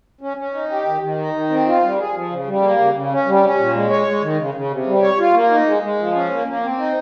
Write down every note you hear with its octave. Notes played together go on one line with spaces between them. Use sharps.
C#4
C#4
D#4
G4
D#3
D#3
D#4
D#3
C4
F4
G3
G#4
F3
C#3
G3
A#3
C#3
C#3
C#4
G3
C#4
A#2
G#3
C#5
G#3
D#3
C#3
C#3
C3
G3
C#5
F4
A#3
D#4
G#3
G#3
F3
C#4
A#3
A#3
C4
D#4